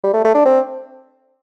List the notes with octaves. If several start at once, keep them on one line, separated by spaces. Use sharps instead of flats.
G3
A3
A3
D4
C4